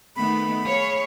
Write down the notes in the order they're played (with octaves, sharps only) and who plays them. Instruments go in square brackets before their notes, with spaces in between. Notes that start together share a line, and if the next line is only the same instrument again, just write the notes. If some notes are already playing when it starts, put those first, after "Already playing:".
[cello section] D#3 A3 B3 [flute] B5
[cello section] G#4 C#5 F5